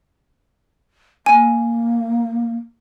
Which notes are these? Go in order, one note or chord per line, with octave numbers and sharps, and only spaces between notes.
A#3 G#5